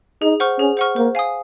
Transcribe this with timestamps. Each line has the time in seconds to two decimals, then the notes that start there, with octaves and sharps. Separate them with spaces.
0.22 D#4 G#4
0.40 C5 F#5 C#6 F6
0.59 C#4 G#4
0.77 C5 F#5 C#6 F6
0.96 A#3 C5
1.15 F5 G#5 D#6